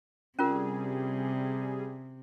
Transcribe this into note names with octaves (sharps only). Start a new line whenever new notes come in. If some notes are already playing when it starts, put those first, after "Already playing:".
C3 G3 C#4 F4 G#4 A#4